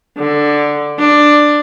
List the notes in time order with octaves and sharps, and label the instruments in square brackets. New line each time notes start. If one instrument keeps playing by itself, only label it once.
[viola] D3
D4